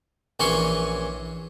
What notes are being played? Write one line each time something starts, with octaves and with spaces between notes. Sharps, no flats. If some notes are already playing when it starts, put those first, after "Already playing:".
A#1 E3 C#4 C#5 C6 C#6